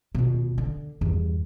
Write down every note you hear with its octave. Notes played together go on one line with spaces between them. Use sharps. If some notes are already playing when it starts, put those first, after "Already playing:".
D#1 B2
D3
E2 G2